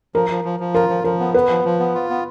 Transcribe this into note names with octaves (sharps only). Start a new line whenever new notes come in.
F3 A#4
F3
F3
F3
F4 A#4
F3
F3 A#4
B3
B3 B4
F3
F3
B3
F4
B3